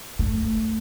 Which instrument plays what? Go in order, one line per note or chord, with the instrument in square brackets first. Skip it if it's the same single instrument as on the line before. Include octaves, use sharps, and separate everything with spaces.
[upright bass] A3